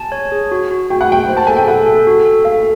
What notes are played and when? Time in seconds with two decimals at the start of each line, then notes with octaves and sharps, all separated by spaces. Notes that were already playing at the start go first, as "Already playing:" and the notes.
Already playing: G#5 A5
0.12 C#5
0.32 G#4
0.52 F#4
0.71 F#4
0.90 F#4 G5
1.01 F#5
1.09 F#4 G5
1.29 C5
1.37 A5
1.47 A4 G#5
1.57 G5
1.67 A4 F#5
1.86 A4
2.07 F#4
2.25 A4
2.45 A4 F5